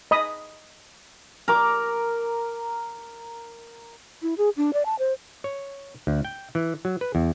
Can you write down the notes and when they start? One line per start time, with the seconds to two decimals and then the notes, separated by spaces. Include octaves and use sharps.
0.11 D#5 B5 D#6
1.48 A#4 D6
4.22 E4
4.38 G#4
4.57 D4
4.73 D5
4.86 A5
4.99 C5
5.44 C#5
6.07 D2
6.25 G5
6.55 E3
6.85 F#3
7.01 B4
7.15 E2